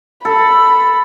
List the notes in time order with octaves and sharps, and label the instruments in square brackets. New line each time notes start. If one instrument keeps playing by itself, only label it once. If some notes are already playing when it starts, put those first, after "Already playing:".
[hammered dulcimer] A4 [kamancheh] B5